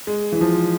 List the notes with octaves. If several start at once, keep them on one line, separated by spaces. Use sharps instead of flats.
G#3
E3
F3